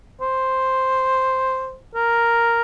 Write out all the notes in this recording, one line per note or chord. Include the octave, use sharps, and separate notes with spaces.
C5
A#4